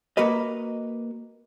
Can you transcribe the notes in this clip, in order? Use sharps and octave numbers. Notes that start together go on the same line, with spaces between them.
A#3 F#4 A#4 B4 D#5